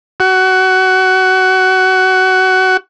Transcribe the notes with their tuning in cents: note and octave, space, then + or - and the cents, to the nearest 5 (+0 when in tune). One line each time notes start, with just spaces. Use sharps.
F#4 +20